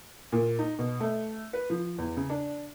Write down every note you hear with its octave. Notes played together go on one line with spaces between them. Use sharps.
A#2
D#4
B2
A3
B4
F3
E2
C#3
D4